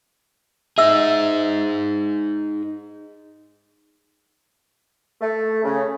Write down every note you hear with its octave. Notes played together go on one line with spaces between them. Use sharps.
D#4 G#4 E5 E6
A3
C#3